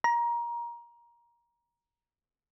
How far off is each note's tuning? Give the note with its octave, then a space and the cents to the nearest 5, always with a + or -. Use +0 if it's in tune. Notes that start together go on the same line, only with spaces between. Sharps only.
A#5 +20